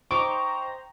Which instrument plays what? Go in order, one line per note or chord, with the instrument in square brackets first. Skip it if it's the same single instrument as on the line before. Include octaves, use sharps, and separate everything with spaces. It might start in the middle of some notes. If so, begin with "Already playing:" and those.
[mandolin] D#4 G5 D6 [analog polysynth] C5 A#5 [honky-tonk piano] C#6